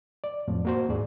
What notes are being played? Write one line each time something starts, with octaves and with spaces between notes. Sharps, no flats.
D5
F2 A2 F3
A#3 F#4 C5
D#2 G#2 G#4 D5